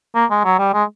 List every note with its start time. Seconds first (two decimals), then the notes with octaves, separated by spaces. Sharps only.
0.15 A#3
0.31 G#3
0.45 F#3
0.59 G3
0.74 G#3